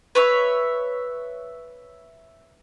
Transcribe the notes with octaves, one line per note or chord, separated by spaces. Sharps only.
B4 C#5 E5